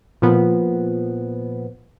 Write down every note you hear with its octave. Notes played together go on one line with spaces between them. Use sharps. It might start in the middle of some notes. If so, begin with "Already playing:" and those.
A#2 F3 B3